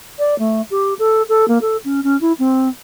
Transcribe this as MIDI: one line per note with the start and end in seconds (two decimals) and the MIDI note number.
0.19 0.38 74
0.39 0.62 57
0.70 0.94 67
0.99 1.22 69
1.29 1.45 69
1.48 1.58 58
1.61 1.77 69
1.85 2.01 61
2.04 2.19 61
2.21 2.32 64
2.39 2.68 60